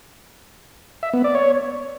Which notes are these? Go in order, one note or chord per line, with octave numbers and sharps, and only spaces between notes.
E5
B3
D5
C#5